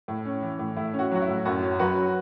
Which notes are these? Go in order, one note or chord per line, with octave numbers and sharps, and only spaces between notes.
A2
C#4
E3
A2
A2 E4
C#4
F#4
F#3 F#4
E4
A2
F#2 F#4
C#4
F#3 F#4 B4